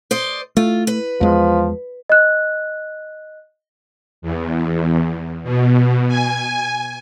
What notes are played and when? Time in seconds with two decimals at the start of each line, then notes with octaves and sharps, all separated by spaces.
0.11 C5 D5 D#5
0.57 A3 F4
0.87 B4
1.21 E2 F3 G#3
2.09 D#5 F#6
4.22 E2
5.43 B2
6.08 G#5